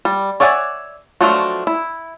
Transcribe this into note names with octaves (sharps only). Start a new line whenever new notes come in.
G3
C#5 D5 E5 F#5 G#5
F3 F#3 A3 D4 F#4
E4